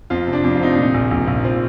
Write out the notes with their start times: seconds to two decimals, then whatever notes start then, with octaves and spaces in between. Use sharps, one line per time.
0.10 F2 F4
0.27 C3
0.33 D4
0.44 F2
0.55 F4
0.60 C3 D#4
0.73 D4
0.78 A#2 D#4
0.94 A#1
1.11 A#1
1.27 A#1
1.44 F3 C4